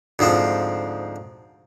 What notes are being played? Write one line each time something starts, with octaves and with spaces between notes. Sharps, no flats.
D2 G#2 F3 C4